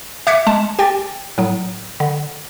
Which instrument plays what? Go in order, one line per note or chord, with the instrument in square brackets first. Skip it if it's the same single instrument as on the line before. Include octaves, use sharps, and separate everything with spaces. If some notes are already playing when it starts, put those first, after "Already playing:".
[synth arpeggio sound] E5 D6 F#6 G#6 B6 C#7
G#3 A5
G4 G5 G#5 A6
A2 F#3
D3